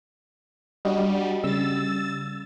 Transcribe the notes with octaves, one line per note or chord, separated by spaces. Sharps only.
G3 D4 F#4 D#5
C#3 G3 E6 A6